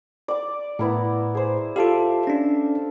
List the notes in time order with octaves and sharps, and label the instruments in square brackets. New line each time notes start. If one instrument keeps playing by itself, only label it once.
[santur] D5 D6
[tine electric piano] A2 [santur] B3 E4 A#4
[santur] G#4 C5
[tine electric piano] F4 G4 [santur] A4 E5 F5
[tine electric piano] C#4 D4